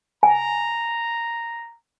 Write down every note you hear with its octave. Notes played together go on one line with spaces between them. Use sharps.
G#5 A#5